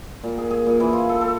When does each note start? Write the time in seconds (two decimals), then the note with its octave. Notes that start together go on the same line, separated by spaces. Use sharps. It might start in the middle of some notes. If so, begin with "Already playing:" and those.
0.24 A#2
0.38 G#4
0.51 G#4
0.66 A#2
0.80 E3
0.93 F4
1.09 A4
1.21 A4